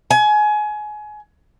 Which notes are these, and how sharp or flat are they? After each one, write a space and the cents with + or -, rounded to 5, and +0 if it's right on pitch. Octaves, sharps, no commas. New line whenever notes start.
G#5 +25